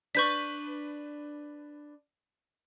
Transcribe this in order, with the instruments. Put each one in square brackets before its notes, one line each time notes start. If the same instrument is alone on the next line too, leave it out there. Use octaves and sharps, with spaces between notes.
[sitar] D4 B4 [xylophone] C#6 G6 B6